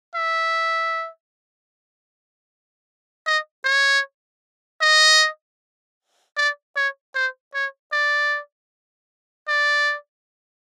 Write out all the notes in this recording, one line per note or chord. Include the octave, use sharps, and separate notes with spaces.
E5
D#5
C#5
D#5
D5
C#5
C5
C#5
D5
D5